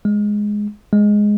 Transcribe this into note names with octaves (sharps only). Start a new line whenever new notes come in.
G#3
G#3